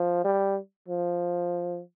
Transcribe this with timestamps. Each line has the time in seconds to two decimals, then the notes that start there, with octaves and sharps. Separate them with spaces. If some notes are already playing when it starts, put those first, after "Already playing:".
Already playing: F3
0.25 G3
0.88 F3